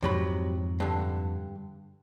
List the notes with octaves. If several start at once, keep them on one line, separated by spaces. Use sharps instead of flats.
F2 G#2 C3 F#3 B5
G2 D3